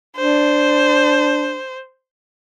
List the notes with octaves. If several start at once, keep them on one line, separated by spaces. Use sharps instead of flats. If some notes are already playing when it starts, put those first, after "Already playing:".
D4 C5